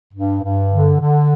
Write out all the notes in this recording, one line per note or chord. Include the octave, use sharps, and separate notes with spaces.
G2
G2
D3
D3